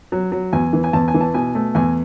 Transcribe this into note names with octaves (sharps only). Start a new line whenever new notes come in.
F#3
F#3
E2 G#5
E3
G#5
E2 A5
G#5
E3
A5
B2 G#5
A3
E2 G#5